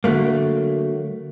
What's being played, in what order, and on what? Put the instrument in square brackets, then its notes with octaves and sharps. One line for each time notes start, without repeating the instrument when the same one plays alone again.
[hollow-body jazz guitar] D3 F#3 A3 A#3